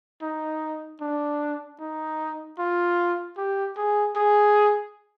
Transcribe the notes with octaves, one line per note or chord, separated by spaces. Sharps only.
D#4
D4
D#4
F4
G4
G#4
G#4